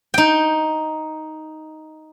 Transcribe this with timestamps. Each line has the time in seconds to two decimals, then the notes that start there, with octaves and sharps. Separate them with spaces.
0.14 D#4 G5